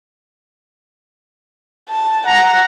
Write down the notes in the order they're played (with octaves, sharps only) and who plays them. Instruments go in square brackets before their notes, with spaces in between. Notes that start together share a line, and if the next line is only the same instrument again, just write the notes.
[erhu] A5
[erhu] F#5 [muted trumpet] A#5